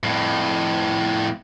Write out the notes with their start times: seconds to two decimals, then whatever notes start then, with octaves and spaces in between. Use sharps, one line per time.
0.04 F2 A2